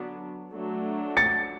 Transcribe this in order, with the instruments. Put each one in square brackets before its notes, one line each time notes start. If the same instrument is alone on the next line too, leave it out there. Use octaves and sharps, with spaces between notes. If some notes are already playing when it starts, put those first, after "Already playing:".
Already playing: [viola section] D3 F#3 B3 D4
F#3 A3 D4
[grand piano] A6 C#7